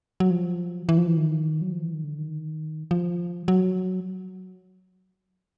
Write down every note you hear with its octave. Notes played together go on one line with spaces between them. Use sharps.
F#3
F3
E3
F3
E3
D#3
F#3
F3
E3
D#3
D3
D#3
F3
F#3